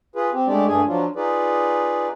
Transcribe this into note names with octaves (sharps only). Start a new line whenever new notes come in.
F4 G#4 B4
C4 G4
G#3 A3 D4 G4 D5
G2 A3 D4 G#4 G#5
F3 F#3 D4 F4
D#4 F4 G#4 B4 D5